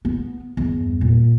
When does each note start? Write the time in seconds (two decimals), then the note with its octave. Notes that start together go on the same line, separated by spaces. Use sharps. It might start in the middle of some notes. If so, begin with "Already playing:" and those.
0.05 B3
0.57 E2 G2
1.01 A#2